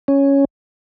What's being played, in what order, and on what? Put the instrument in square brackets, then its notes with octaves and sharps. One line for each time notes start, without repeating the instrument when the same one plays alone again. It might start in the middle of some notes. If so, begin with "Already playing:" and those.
[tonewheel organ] C#4